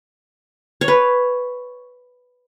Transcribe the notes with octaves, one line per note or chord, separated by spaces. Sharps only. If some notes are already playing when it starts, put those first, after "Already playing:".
C#5
B4